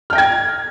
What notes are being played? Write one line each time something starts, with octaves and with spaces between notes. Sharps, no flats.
G5 F6 G#6 A#6